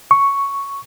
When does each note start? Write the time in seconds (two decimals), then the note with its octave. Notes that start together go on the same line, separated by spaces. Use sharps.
0.11 C#6